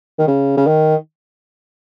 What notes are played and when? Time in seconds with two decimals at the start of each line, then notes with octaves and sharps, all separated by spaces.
0.19 D#3
0.27 C#3
0.57 C#3
0.67 D#3